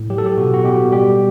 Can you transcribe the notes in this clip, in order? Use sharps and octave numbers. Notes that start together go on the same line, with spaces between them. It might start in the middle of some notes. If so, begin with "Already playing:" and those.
Already playing: A2
F#3 G4
A4
G4
B2 F#4
F#4
B2 G4
G3 G4